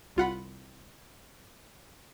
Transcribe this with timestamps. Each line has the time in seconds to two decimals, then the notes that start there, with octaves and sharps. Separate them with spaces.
0.16 C2 F4 F#5 B5